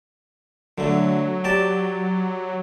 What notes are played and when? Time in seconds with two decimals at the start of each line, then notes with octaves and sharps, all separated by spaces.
0.78 D3 F#3 A3
1.44 G4 D5 A5